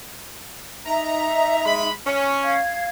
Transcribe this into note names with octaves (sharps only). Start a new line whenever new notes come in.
D#4 E5 A#5
G#3 B5
C#4
F5 G#6